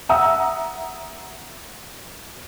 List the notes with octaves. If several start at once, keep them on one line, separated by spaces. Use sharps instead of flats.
E5 F#5 A#5 D#6 E6